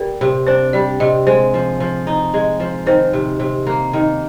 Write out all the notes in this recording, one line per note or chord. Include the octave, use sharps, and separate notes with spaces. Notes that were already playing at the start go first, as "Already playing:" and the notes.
Already playing: G3 A#4
C3
D4 C5
G3 D5
C3 D#5
G#3 C5
F3
F3
D#4
G#3
F3
D#3 C5
C3
C3
A#3
D#3